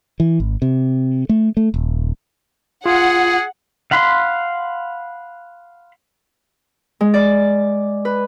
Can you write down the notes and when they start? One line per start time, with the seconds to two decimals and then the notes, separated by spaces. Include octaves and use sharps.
0.20 E3
0.40 G#1
0.62 C3
1.29 A3
1.57 A3
1.74 D#1
2.86 F4 G#4 F#5
3.91 F5 F#5 B5 C6
7.01 G#3
7.14 D5
8.05 B4